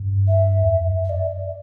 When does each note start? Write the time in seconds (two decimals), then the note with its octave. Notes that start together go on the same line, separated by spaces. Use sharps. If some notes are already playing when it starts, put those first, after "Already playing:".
Already playing: G2
0.28 E5
0.62 E2
0.69 F#2
1.05 E5
1.10 D5